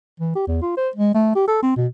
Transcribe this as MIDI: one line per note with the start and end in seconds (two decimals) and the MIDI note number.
0.20 0.32 52
0.35 0.45 67
0.47 0.57 40
0.62 0.73 65
0.77 0.89 72
0.95 1.14 56
1.14 1.34 57
1.35 1.45 67
1.47 1.58 69
1.62 1.75 60
1.76 1.86 47